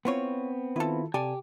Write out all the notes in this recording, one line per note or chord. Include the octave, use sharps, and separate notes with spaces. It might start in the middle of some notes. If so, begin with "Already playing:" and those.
B3 C4 E4 F4 C#5
D#3 E4 F4 A4 B4
C3 G4 A4 D5 G#5